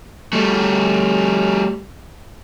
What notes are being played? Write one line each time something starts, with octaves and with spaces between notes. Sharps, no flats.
G3 A3